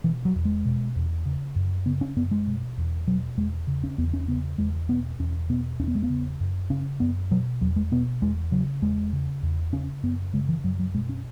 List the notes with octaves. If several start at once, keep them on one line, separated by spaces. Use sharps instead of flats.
B2 E3
F#3
E2
G#3
B2
E2
C#3
F#2
C#3 B3
C#4
F#2 B3
G#3
B2
E2
B2 F#3
E2 G#3
C#3
C#4
E2 B3
C#4
C#3 B3
E2 G#3
B2 B3
E2 C#4
B2 B3
E2 C#4
B3
G#3
B3
C#3
F#2
C#3 C#4
F#2 B3
B2 F#3
E2 F#3
G#3
B2 B3
E2 G#3
C#3 F#3
E2 G#3
C#3
E2
C#3 C#4
F#2 B3
C#3 G#3
E3
F#2 F#3
F#3
B2 G#3
C#4